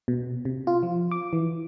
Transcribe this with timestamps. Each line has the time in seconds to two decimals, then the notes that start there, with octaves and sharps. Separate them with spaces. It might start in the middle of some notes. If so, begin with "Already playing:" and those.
0.08 B2
0.45 C3
0.67 F4
0.83 F3
1.11 D6
1.33 E3